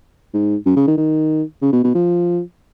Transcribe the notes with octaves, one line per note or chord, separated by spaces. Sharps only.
G#2
F#2
C#3
D#3
D#3
C#3
B2
B2
F3